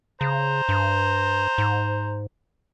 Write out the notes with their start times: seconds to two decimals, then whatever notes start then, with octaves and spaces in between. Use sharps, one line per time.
0.21 C#3 C5 A#5
0.69 G2
1.58 G#2